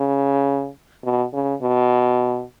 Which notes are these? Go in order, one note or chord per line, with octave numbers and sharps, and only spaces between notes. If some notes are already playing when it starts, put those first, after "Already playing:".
Already playing: C#3
B2
C#3
B2